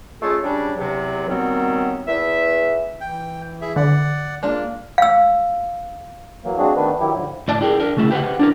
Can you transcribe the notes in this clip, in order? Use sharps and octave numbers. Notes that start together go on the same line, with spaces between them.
G#3 A3 C#4 F4 G#4 A4
C#3 G3 C#4 D4
E2 C3 F#3
D#2 D#3 F#3 G3 B3 C4
E2 E5
E3 G5
E4 G#4 E5
D3 D5 F#5
G#3 A#3 D4 F4
F5 E6
E3 F#3 A#3
G#3 C4 D4 F#4 G#4
D#3 A3 B3 D4 B4
D#3 F#3 E4 G4
G#2 D3 F3
A2 D5 A5
E4 G4 G#4 A#4
D4 A#4
C#3 A3 E4
G4 B4 C5 F#5
D4 E4 A#4